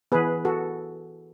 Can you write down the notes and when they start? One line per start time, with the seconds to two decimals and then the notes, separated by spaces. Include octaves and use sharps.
0.12 E3 B3 G#4 B4
0.45 F#4 A4